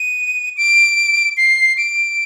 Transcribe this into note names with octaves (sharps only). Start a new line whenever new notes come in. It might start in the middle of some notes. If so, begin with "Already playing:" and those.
Already playing: D#7
D7
C7
D7